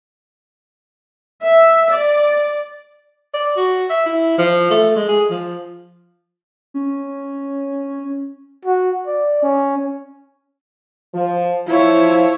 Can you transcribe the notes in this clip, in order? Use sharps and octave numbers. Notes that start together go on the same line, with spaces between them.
E5
D5
D5
F#4
E5
E4
F3
A3
G#3
G#4
F3
C#4
F#4
D5
C#4
F3
F3 E4 C#5